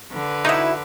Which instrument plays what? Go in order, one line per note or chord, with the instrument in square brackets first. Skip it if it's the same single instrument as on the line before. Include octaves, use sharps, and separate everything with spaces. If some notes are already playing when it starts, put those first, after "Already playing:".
[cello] D3 B4
[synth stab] D#4 [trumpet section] E4 [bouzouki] F#4 E5